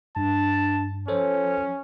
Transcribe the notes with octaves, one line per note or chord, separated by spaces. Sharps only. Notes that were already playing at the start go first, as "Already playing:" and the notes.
G2 D4 A5
F3 C#4 A4 C5 C#5